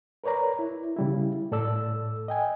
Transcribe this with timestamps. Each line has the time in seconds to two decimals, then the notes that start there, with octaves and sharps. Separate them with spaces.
0.24 A#4 B4 C#5 D5 A#5
0.59 E4
0.96 C#3 G3 E4
1.52 A2 A4 D5 E6
2.28 D#5 G5 G#5